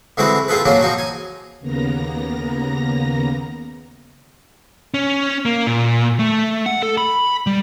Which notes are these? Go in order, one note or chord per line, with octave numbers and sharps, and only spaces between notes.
D3 E3 G#3 C4 F#4 B4
C4 F4 G#4 A4 B4
F#3 A#3 C#4 D4 F4
F3 D#4 F#4
G#5
D#2 C#3 A#3 B3 A#5 A#6
C#4
A#3
A#2
A3
F#5
A4
B5
G3